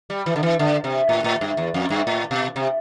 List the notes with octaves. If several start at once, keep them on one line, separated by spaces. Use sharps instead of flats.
G3
E3
D3
E3
D3
C3
A2
A2
G2
E2
F2
G2
A2
B2
C3